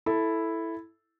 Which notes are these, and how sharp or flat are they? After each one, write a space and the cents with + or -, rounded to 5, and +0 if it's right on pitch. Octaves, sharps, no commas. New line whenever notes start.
E4 +0 A4 +0